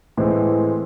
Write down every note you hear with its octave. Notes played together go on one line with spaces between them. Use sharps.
A2 E3 G#3 A3 C4